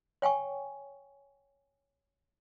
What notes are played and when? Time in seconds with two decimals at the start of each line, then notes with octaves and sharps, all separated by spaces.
0.22 C#5 G5 G#5 C#6